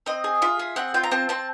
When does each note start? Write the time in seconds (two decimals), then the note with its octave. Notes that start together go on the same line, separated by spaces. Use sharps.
0.06 C4 D#5
0.24 G#4
0.42 F4 E5
0.59 G#4
0.76 C4 F#5
0.94 F4 G5
1.04 A#5
1.11 C4 A5
1.29 C4 A5